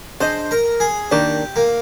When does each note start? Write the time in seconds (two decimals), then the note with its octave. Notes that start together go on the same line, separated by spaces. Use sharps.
0.20 D4 G#4 C5 D#5
0.51 A#4
0.80 G#4
1.11 D#3 A#3 D4 G4
1.56 A#3